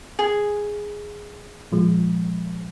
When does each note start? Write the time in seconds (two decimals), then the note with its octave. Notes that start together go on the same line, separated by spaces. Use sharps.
0.19 G#4
1.72 A#2 F3 G#3